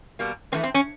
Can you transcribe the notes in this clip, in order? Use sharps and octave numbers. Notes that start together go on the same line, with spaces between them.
B2 G3 A#3
A2 E3 A3 C4
C4
C#4